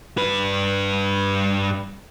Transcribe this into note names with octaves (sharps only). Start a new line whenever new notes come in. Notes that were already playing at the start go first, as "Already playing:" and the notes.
G2 B4